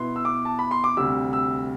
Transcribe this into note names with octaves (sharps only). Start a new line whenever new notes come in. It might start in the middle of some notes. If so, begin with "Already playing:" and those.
Already playing: B2 B3 E4 C6
E6
D6
A5
B5
C6
D6
D2 C3 G3 E6
E6